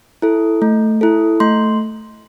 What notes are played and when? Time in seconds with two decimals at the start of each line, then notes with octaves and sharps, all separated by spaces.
0.22 E4 A4
0.62 A3
1.01 E4 A4
1.40 A3 C6